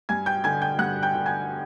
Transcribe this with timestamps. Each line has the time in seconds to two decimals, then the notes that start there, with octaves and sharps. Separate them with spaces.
0.09 G2 G#5 G#6
0.26 G5 G6
0.44 D3 G#5 G#6
0.62 G5 G6
0.79 G2 F#5 F#6
1.02 G5 G6
1.14 D3
1.26 G#5 G#6